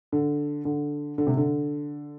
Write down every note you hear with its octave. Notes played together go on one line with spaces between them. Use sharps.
D3
D3
D3
C3
D3